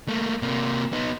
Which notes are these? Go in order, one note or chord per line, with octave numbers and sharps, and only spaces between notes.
A3 A#3
C3 A#3
B3 D#4